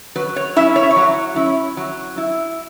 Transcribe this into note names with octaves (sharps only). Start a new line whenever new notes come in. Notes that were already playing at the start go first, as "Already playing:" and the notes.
F#3 B4
C#5
C#4 E4 E5
C#5
E5
C#5
F#3
C#4 E4
F#3
E4